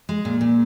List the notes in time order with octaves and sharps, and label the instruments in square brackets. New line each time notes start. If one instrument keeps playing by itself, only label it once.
[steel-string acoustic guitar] G#3
A#2
A#2